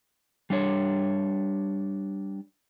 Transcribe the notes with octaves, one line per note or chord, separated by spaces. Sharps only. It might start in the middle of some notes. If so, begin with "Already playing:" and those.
G3 D4 C#5